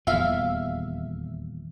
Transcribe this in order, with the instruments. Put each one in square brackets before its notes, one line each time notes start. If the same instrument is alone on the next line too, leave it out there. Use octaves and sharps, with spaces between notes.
[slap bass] D#1 E2 F3 [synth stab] E5 F5